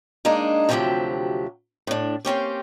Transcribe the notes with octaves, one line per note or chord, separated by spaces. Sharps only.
G#3 A#3 D4 D#4
D2 C3 F3 F#3 G4 E5
A2 D4
A#3 C4 C#4 G4